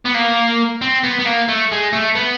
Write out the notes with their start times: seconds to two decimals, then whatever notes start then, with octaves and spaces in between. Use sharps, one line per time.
0.05 B3
0.15 A#3
0.82 C4
1.04 B3
1.20 B3
1.26 A#3
1.49 A3
1.71 G#3
1.93 A3
2.15 B3